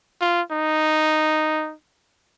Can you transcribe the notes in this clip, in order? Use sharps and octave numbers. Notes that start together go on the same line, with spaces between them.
F4
D#4